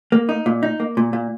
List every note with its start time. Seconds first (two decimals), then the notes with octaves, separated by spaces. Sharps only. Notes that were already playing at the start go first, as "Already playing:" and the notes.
0.12 A#3
0.29 D#4
0.46 A#2
0.63 D#4
0.80 A#3
0.97 A#2
1.13 A#2